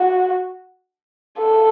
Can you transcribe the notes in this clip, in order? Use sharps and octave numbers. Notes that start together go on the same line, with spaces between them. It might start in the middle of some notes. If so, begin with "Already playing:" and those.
Already playing: F#4
A4